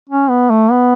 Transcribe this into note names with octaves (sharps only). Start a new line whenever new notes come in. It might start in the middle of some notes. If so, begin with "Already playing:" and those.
C#4
B3
A3
B3